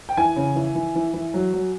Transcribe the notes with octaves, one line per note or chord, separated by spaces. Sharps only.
G5
E3 G#5
C#3
E3
E3
E3
E3
F#3
F#3